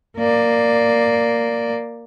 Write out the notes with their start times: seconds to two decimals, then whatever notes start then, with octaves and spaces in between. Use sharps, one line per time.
0.17 A#3 D5